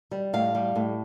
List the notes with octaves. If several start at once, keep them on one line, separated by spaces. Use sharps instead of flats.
G3
A2 F5
G3
A2